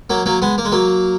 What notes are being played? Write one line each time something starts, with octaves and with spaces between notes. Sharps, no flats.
F#3 A#3
F#3 A#3
G#3 B3
A#3
G#3
F#3 A#3